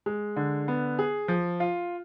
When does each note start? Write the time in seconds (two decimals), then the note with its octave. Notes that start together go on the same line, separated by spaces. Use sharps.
0.06 G#3
0.36 D3
0.68 B3
0.99 G#4
1.28 F3
1.60 F4